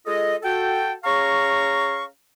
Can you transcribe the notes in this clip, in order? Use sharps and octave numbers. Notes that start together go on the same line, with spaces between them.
G#3 F4 A4 D#5
F#4 A4 G5
C#4 G#4 F5 A#5 C#6